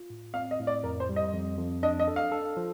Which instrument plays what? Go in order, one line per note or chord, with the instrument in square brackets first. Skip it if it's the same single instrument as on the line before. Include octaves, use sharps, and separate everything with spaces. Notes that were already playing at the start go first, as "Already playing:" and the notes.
Already playing: [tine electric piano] F4
A2
[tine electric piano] C4 [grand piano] F5
[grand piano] D#5
[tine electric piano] A2
[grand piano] D5
[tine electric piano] F2 [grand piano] A#4
[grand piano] C5
[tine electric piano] G3
[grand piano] D#5
[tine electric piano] F2
F2
[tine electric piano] D4 [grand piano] D#5
[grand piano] D#5
[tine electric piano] A4
[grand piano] F5
[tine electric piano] A4
F3